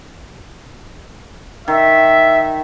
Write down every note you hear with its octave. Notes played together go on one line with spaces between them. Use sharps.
D#3 E5